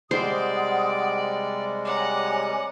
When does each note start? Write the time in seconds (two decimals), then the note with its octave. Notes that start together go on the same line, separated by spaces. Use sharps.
0.11 C3 G3 G#3 C5 D5 F#5 D#6
1.85 C#5 F#5 G#5 A#5 D6